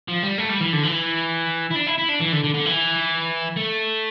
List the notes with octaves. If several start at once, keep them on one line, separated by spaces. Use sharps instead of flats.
F3
G3
A3
G3
E3
D3
E3
E4
D4
E4
E4
D4
E3
D3
D3
D3
E3
A3